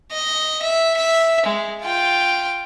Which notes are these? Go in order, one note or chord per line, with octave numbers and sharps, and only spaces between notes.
D#5
E5
E5
G#3
F4 G5